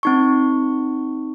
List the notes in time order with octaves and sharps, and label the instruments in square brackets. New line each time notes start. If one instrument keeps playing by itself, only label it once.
[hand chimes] C4 D#4 C#6